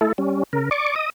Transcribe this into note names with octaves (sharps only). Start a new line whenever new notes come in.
A3 E4 A4
G3 C#4
C#3 A#4
D5 C#6 D6
D#5 D#6